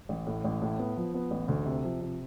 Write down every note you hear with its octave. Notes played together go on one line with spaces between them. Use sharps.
A1
A2
A1
A2
B3
F3
B3
A1
D2
C3
F3
C3